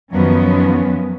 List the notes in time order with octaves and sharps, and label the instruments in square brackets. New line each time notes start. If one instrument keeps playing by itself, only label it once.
[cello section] F#2 D#3 F3 F#3 B3 C#4